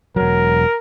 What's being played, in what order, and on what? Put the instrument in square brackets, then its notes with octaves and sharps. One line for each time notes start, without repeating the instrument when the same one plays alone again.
[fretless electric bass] E1 F#3 [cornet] A#4